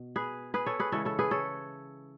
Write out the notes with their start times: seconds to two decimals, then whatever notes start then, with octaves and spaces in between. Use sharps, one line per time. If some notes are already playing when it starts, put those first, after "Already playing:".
Already playing: B2
0.16 G#4 B4
0.54 G#4 B4
0.66 A4 C#5
0.80 G#4 B4
0.92 C#3 E3 G#3 A4 C#5
1.05 A4 C#5
1.19 G#4 B4
1.31 A4 C#5